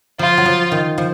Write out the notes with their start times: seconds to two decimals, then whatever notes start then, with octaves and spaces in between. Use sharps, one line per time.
0.19 F3 F4
0.37 F#3
0.45 F3
0.71 D#3
0.98 F3